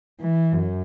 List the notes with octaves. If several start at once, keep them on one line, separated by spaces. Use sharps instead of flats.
E3
F#2